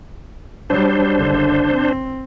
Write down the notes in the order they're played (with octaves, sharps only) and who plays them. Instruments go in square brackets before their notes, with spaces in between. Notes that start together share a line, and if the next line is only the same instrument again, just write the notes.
[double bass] F#3 G3 [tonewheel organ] D4 C5
[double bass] F#1 D3
C4